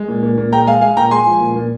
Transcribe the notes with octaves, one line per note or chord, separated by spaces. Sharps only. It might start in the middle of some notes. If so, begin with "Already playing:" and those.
Already playing: G#3
A#2
A#2
A#2
G#3 G5 A#5
G#3 F5 G#5
G#3 F5 G#5
A#2 G5 A#5
G#3 G#5 C6
F3
A#2
A#2